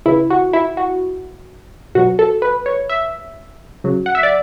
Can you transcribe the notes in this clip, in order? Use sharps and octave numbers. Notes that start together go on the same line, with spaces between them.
C#3 E3 E4
F#4
E4
F#4
B2 F#3 F#4
A4
B4
C#5
E5
C#3 F#3
F#5
E5
D5